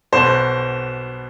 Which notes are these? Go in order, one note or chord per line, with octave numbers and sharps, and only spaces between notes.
B1 B2 B3 C5